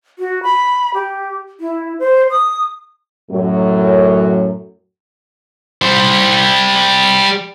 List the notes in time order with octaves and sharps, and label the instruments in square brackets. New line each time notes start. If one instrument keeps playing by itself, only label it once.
[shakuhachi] F#4
B5
G4
E4
C5
D#6
[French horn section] F#2 A2 F#3
[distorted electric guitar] G3 C5